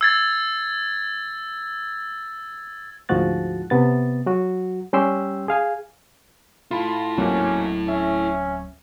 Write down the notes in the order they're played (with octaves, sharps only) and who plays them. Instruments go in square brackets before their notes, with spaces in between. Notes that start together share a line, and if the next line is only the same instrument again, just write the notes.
[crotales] E6 G#6 A6
[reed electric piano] D2 G#2 F3 F#4 F#6 A6
C3 B3 A6
F#3 F#4
G3 C#4 G4 G5 C6 E6
G#4 F5 G#5
[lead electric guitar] E4 A4 [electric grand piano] F4 B5
[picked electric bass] D1 F#3 C4 [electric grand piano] G#2 A#3 F#4 [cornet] C#4
[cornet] C#4 [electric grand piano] E5